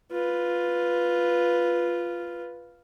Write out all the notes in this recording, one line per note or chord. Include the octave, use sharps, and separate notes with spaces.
F4 B4